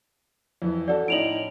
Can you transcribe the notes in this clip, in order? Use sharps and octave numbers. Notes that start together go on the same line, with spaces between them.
F2 E3
C#4 F#4 A4 D5
A2 C#4 D#4 D7 F7 F#7